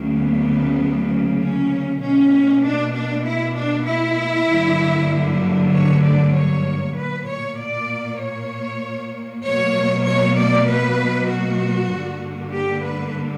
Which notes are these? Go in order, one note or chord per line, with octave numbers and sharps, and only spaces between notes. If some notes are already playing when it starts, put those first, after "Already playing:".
Already playing: D2 C#3 F#3 A#3
B3
C#4
B2 A#3 C#4
D4
D4
E4
D4
E4
G2 D3 F#3 A#3
C#5
D5
C#5
A#2 A#3 B4
C#5
D5
C#5
B2 F#3 A#3 C#5
C#5
D5
B4
F#4
G2 D3 A#3
G4
B4